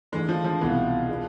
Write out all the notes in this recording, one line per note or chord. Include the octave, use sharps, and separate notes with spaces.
G#2 E3 G#3 A3 D4
F3
F3
C2 B2 E3 B3
G#3 B3 F4 B4 D5